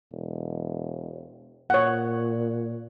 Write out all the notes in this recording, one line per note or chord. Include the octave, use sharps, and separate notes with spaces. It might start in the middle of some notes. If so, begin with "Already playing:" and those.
E1
A#2 C#5 F#5